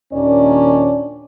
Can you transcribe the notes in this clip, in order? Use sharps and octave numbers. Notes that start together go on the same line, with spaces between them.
D#2 A#2 D#3 C#4 D4 D5